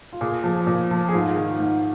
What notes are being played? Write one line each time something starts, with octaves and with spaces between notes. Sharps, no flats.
F4
A#2 G#4
F3
A#2
F3
G#4
G#2 F4
D#3
G#2